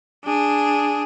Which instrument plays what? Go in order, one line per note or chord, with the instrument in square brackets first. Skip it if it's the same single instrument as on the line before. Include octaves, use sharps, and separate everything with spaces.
[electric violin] D4 G#4